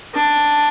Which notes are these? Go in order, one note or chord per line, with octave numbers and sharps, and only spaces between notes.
D4